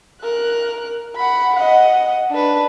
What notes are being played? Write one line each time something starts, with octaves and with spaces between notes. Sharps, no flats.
A#4 F#6
F#5 B5
D#5 F#5
D4 B4